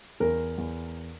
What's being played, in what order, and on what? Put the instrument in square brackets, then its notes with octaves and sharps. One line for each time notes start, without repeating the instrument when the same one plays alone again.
[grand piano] E2 A#4
E2